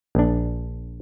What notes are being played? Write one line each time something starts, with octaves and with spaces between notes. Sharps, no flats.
A#1 D4